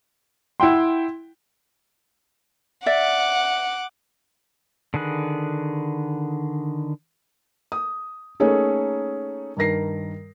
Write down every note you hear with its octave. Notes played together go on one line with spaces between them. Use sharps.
E4 F#5 G5 C6
D5 E5 F#5 D6
D3 D#3 G#4 B4
D#6
A3 A#3 C#4 D#4 G#4 A4
G2 D#3 A#4 A#6 C7